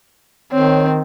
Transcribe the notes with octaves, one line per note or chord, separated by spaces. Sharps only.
D#3 C4 C#5